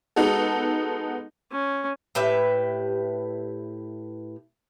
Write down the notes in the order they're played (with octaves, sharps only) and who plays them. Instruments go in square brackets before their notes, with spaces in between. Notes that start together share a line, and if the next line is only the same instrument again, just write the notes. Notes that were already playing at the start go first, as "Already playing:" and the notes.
[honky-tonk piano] G#3 B3 D#4 F#4 A4
[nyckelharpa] C#4
[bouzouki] A2 G4 B4 E5